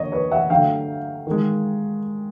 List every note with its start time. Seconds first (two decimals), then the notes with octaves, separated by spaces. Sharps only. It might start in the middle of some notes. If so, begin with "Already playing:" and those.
Already playing: D3 F#3 A#3 C#5 D#5
0.12 B4 C#5
0.32 E5 F#5
0.50 D3 F#3 A3 F5 G5
1.27 D#3 G#3